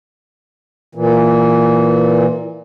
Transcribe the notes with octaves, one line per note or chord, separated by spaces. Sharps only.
A#2 E3